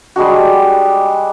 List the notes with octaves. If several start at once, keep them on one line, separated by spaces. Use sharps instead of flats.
G3 G#3 D4 F#4